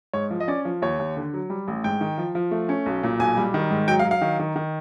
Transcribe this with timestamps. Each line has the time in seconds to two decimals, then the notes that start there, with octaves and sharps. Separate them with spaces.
0.13 G#2 C#5
0.30 F3
0.40 D#5
0.48 C#4 D5
0.65 F3
0.82 D#2 C#5
0.99 D#2
1.16 D3
1.34 F#3
1.50 G3
1.68 A1
1.84 G#2 G5
2.01 D#3
2.18 F3
2.35 F3
2.51 A3
2.69 C#4
2.86 B1
3.03 A#2
3.19 B1 G#5
3.37 G3
3.54 D#3
3.71 G#2
3.88 F#3 G5
3.99 F5
4.04 F#3
4.11 F5
4.21 D#3
4.39 D#3
4.56 D#3